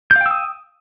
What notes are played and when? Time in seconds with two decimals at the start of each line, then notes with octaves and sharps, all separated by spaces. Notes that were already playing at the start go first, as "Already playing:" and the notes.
0.11 G6
0.16 F5
0.21 G5
0.26 E6
0.31 D#6